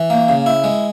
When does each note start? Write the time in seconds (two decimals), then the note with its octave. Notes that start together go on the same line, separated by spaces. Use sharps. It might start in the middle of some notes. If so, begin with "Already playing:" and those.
Already playing: E3
0.10 A#3
0.29 C#3
0.46 E4
0.64 G#3